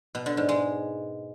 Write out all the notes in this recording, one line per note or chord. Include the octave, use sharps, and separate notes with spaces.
B2
D3
G#2
G#3